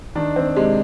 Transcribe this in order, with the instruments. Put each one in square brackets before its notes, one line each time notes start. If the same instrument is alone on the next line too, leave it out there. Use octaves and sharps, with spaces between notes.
[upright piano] D#3 D4
D#3 C4
C3 G#3